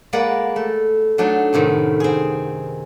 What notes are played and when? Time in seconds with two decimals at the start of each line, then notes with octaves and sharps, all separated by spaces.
0.13 G#3 A#3 B4 D5 F#5
0.56 A3
1.18 F#3 A3 D4 D#4
1.53 F#2 A2 C3 D#3
2.00 C4 G#4